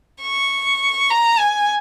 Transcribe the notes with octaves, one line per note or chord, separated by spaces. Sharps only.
C#6
A#5
G#5